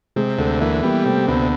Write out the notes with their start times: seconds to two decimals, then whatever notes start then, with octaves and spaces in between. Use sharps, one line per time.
0.16 C3 G#3
0.38 D2 A3
0.61 E3 A#3
0.83 G3 B3
1.05 C3 A3
1.28 D2 B3